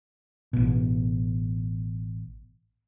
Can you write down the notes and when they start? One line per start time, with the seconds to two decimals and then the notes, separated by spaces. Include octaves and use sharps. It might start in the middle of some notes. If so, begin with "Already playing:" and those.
0.53 A1 B2